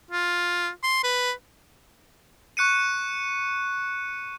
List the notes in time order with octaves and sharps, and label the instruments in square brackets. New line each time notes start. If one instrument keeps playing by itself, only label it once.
[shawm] F4
C6
B4
[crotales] C#6 F#6 C#7 D#7